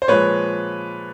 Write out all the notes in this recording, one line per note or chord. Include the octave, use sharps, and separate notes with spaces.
C5
A#2 F3 G#3 B4 C#5